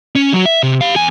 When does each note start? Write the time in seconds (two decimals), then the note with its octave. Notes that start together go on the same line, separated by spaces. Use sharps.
0.15 C#4
0.33 F#3 F#4
0.45 E5
0.63 C3
0.81 G4 F5
0.95 E2 G#5